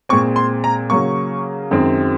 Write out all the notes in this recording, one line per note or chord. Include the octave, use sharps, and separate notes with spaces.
A#2 G#3 C4 C#6
C6
A#5
C#3 F#3 A#3 C#6
F#2 D#3 G#3 C4